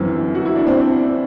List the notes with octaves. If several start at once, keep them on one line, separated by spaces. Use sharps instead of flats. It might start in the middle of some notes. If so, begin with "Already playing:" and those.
Already playing: G1 F#2 E3 C4
F#4
E4
D4
C4